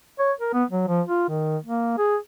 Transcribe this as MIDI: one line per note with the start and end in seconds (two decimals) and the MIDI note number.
0.19 0.32 73
0.40 0.53 70
0.53 0.64 59
0.71 0.87 54
0.88 1.01 53
1.07 1.29 65
1.29 1.57 51
1.65 1.94 58
1.98 2.17 68